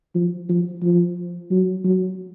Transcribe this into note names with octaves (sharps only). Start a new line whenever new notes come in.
F3
F3
F3
F#3
F#3